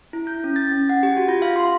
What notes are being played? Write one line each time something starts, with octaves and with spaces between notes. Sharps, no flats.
E4
G6
C#4
A6
C#4
F#5
G4
F#4
F4
F5
C6